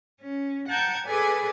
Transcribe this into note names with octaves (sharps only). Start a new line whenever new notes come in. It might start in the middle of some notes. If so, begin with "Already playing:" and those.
C#4
F#5 G5 A5 A#5 G6 G#6
G#4 A4 B4 D5 G#5